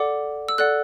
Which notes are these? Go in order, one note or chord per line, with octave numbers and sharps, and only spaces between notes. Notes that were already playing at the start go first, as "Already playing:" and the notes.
Already playing: A4 D5 F#5 D6
E6
A4 D5 F#5 F#6